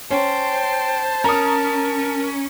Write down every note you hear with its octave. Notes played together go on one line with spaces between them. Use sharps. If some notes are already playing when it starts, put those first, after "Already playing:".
C#4 C5 G5 A5
C#4 A#4 A#5 D#6